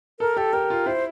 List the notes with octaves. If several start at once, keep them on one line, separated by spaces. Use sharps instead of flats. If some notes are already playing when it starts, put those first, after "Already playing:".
A4 A#4
G4 A4
G4 A#4
F4
E4 C5